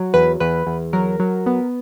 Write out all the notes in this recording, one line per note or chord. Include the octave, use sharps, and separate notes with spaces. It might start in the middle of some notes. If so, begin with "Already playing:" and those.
Already playing: F#3
E2 B4
E2 B4
E2
F#3 A#4
F#3
B3